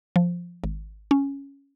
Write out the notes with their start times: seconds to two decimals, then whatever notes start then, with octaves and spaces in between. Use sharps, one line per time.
0.16 F3
0.64 G#1
1.11 C#4